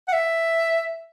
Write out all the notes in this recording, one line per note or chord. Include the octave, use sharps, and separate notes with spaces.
F#5
E5